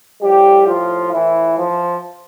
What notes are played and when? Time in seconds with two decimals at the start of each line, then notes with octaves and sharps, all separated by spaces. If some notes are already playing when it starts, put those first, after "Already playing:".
0.22 A2 F3 G3 G4
0.67 F3 F4
1.12 E3 E4
1.57 F3